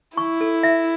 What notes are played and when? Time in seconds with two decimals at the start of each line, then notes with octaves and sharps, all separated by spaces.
0.17 E4 C#6
0.41 A4
0.63 E5